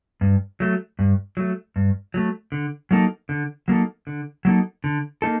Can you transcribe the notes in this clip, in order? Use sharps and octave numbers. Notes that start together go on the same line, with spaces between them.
G2
F#3 A3
G2
F#3 A3
G2
F#3 A3
D3
F#3 A#3 D#4 A4
D3
F#3 A#3 D#4 A4
D3
F#3 A#3 D#4 A4
D3
A#3 D#4 A4